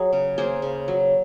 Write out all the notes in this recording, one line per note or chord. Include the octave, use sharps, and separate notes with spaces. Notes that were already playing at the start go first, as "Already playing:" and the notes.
Already playing: F#3 G#4
C#3
A#3 G#4 C5
C#3
F#3